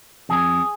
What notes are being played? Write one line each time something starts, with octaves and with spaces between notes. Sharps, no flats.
F2 G#4